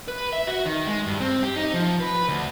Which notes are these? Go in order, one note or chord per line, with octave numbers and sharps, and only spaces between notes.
B4
E5
F#4
D#3
G#3
G2
C4
G4
D#4
F3
B4
D2